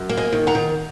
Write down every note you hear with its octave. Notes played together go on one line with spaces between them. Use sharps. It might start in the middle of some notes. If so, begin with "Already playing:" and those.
Already playing: F#2
A#3
D#5 G#5
D#3
F#5 A#5
D#3